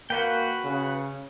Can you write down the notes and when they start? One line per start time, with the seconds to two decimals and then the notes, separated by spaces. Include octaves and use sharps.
0.10 A#3 F#4 B4 G5
0.64 C#3